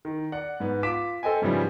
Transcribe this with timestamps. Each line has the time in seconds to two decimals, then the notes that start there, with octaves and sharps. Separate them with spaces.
0.05 D#3
0.32 D5 F#5
0.60 G#2 B3
0.83 F4 D6 B6 E7
1.23 A4 C5 D#5 G5 G#5
1.42 G#2 C#3 E3 F3 G3